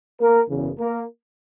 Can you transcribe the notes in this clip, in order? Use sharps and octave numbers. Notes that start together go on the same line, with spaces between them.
A#3 A#4
F#1 E2 C#3
A#3 A#4